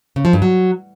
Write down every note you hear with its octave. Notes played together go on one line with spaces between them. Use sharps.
C#3
F3
G2
F#3